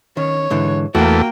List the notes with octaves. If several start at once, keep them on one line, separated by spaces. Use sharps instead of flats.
D#3 C#4 C#5
G#2 D3 E3
E2 A3 A#3 F#4 G5